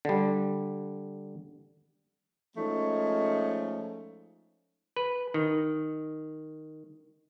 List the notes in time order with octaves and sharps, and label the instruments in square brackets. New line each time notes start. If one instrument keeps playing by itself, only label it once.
[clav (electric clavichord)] D3 G3
[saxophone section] F3 G#3 A3 C#4 D#4
[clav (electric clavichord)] B4
D#3